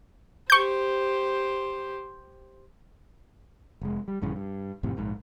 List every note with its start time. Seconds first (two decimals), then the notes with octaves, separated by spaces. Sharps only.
0.50 G4 C5 C#6 G6
3.81 F1 G#3
4.08 G3
4.22 A#1 G2 C#3 E3
4.36 G2
4.83 G#1 F2 A2 C3
4.97 A#1 G#2